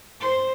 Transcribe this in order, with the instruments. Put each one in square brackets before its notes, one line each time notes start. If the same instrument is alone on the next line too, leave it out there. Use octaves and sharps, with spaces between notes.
[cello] C5